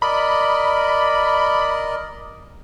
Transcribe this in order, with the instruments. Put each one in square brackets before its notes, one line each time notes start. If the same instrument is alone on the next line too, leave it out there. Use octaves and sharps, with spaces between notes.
[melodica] A#4 D5 D#5 [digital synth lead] B5